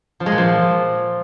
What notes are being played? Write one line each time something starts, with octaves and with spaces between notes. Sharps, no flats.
F3
G#3
A#2
F3